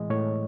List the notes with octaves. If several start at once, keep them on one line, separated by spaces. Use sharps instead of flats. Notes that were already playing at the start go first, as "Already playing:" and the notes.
Already playing: A2 E3 G#3 D#5
A2 C#5